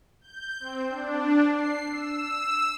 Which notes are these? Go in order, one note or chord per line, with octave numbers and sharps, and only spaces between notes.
G6
C4
D4
C7
E6